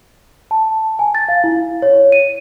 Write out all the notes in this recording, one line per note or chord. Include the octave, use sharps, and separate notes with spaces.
A5
G#5
A6
F5
E4
C#5
D#7